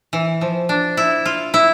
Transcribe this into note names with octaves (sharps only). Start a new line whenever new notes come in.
E3
F3
D4
E4
F4
E4